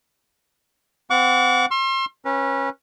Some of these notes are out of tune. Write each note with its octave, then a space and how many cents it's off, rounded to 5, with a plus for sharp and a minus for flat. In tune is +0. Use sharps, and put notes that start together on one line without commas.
C4 -35 F#5 -25 D6 -40
C6 +35 E6 +40
C#4 -25 B4 -35